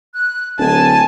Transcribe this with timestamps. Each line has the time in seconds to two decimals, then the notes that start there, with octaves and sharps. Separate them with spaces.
0.14 F#6
0.59 D1 G#5 A5